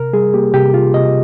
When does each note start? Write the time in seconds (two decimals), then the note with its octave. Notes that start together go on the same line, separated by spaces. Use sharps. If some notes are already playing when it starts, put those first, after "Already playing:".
Already playing: C3 A#4
0.13 G3 G#4
0.34 A#3 G4
0.54 C3 G4
0.74 C3 F4
0.94 C3 D#5